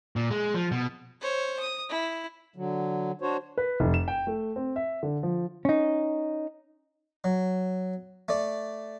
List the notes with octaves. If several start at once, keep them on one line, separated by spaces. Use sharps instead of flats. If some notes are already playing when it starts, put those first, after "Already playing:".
A#2
G#3
F3
B2
C5 C#5
D#6
E4
D3 F#3
D4 F#4 C5 C#5
B4
F1
E7
G5
A3
C4
E5
D3
F3
C#4 D#4
F#3
A3 D5